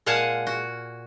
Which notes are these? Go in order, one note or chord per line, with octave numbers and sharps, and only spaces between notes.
A#2 G#3 F5 F#5 G#5 A5
F#4